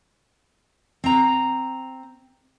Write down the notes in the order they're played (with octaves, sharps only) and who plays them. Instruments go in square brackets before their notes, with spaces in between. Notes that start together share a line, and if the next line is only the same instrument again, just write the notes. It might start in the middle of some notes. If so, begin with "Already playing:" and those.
[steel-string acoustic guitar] C4 A#5